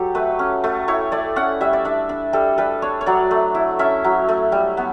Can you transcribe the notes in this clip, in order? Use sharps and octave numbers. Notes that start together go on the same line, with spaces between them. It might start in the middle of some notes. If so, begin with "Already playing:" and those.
Already playing: F#3 G4 A4
A3 B4
C#4
A3
E4 C#5
A3 D5
C#4 F#5
G3 E5
D5
D4 E5
D4
G3 A4
G3 B4
D4 C#5
C#5
F#3 D5
A3
E4
C#4 E5
F#3
A3
G3
B3